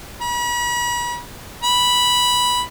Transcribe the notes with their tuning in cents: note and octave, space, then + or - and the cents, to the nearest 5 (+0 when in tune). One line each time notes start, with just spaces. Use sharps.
B5 -40
B5 -5